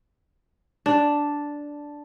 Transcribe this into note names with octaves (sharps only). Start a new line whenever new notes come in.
D4